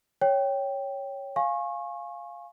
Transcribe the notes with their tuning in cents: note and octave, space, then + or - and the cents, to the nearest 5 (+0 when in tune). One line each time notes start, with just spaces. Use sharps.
C#5 +0 G5 +0
F5 +0 G#5 +0 C#6 -30